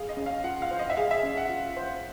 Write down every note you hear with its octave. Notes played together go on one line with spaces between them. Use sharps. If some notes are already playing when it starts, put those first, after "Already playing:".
Already playing: G#4 F5
D#5
C#4
F5
F4 F#5
F5
C5
D#5
E5
G#4 F5
E5
C#4
F#5
F4
C5